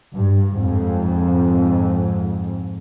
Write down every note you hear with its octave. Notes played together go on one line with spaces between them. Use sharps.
G2
F2 G#2